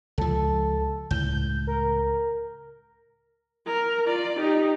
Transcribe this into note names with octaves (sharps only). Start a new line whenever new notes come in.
C#2 F3 A4
C#2 A2 G6
A#4
A#4
F4 D5
D#4 G4